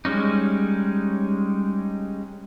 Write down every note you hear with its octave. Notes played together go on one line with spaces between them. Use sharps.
G3 G#3 C#4 D#4